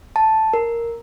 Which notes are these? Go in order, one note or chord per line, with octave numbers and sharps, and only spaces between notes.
A5
A#4